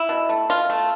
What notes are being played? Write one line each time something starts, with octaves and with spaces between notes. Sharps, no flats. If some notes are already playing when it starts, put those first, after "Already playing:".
Already playing: E4
B2
A3
B2 F4
A3